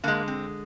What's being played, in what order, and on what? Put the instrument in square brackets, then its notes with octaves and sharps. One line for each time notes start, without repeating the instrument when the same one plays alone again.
[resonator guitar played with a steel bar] D3 G#3 A#3
C4